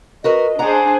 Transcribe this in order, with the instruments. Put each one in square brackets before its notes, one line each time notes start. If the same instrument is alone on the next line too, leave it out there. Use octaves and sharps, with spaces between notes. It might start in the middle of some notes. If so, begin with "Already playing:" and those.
[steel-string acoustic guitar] F#4 A#4 B4 [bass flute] D#5
[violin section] D4 G#4 C5 [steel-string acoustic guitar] F#5 A#5